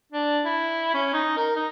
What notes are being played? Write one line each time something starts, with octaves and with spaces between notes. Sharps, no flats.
D4
E4
C#4
D#4
A#4
D#4